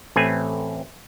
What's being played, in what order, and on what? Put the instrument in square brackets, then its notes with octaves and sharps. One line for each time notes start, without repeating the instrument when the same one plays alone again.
[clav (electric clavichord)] A1 A3 C4 B4 G#5